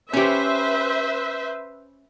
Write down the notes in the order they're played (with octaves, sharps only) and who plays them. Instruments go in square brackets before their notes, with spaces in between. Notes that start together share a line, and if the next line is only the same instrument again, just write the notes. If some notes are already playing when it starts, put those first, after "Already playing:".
[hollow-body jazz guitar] C#4 G4 [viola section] B4 C5 E5